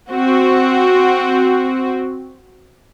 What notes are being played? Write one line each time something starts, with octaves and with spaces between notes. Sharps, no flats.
C4 F#4